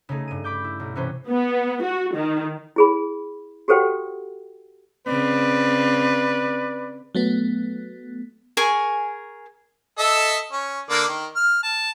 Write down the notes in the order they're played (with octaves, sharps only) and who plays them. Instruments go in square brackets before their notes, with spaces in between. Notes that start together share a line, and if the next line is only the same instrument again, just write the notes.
[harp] C#3 A3 D#4 G#4
G2 D#7
B5 D6 G6
E4
B1
C3 E3 C#4 B4 C5
[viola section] B3
F#4
D#3
[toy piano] E4 G#4 B5
F#4 G4 A4 C5 F#5 G5
[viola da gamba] C#3 C4 [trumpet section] B4 D5
[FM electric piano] F#3 A3 B3
[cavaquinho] G#4 A#4 G#5 C#6
[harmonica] A4 D#5 E5
C#4
D3 A#3 D5
D#3
F6
A5